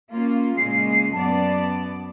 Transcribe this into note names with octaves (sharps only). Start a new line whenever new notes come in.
A#3 C#4 F4
A#2 C#3 G#3 C7
F#2 B3 D5 A5